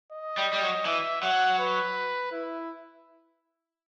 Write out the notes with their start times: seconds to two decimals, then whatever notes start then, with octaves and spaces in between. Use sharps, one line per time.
0.13 D#5
0.37 G3
0.53 G3
0.61 F#3
0.85 E3 E5
1.22 F#3 F#5
1.59 B4
2.32 E4